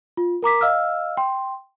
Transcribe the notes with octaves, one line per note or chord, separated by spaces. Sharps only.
F4
A#4 A#5 D6 B6
D#5 F5 E6 F6
G5 C6